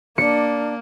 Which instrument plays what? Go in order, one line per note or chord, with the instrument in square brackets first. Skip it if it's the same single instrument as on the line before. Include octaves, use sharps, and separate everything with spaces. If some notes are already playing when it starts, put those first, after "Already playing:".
[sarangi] A#3 [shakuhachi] D4 [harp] C#7